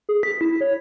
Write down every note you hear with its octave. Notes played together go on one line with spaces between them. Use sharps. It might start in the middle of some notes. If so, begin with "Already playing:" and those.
G#4
B6
E4
C#5